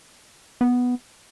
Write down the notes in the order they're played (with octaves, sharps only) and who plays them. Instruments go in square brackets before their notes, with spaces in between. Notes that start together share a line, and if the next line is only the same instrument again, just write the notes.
[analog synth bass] B3